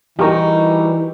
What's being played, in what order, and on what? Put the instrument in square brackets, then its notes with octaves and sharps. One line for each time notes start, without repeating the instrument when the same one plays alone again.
[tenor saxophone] E3 [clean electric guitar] G3 F#4 A#5 [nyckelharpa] D#4 [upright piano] G4 A#4 C#6